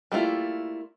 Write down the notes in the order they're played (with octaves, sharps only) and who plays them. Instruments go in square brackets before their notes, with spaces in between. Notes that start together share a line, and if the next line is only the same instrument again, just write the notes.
[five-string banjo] G3 A3 A#3 E4 F4